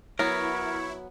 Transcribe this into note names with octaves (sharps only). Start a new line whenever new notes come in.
F#3 B3 E4 A#4 C#5